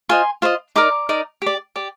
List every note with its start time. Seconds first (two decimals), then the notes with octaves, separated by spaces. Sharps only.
0.09 F4 C5 D#5 G#5 C6
0.42 F4 C5 D#5
0.76 D#4 A#4 D5 A#5 D6
1.09 D#4 A#4 D5
1.42 G4 D5
1.76 G4 D5